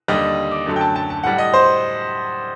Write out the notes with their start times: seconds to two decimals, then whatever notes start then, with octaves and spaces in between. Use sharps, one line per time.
0.08 D#2 D3 G3 D#5
0.51 D6
0.66 F#2 D3 F#3 A3
0.76 G5
0.81 A5
0.96 A5
1.10 A5
1.23 A2 G3 F#5
1.38 D#5
1.54 C5